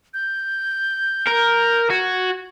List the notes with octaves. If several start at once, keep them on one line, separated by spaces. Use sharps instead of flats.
G6
A#4
F#4 G#6